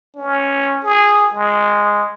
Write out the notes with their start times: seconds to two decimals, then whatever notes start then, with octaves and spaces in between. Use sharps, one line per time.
0.16 C#4
0.83 G#4
1.34 G#3